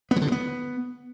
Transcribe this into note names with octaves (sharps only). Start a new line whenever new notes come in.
B3
E3
D3
G2
B3